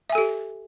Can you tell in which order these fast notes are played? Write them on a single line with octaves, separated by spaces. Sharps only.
E5 G#5 A4 G4